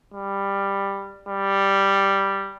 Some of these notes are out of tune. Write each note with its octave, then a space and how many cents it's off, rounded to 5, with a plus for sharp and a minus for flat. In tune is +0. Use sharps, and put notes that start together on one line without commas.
G3 +10
G3 +0